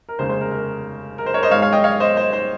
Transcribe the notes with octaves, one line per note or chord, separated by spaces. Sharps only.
A#4
F1 D#2 C#3 G#3 C5
C5
A#4
A#4
A#4
C5
A#4 C#5
C5 D#5
G#1 G#2 D#3 G#3 C#5 F5
C#5 F5
D#5 G5
C#5 F5
C5 D#5
C5
C5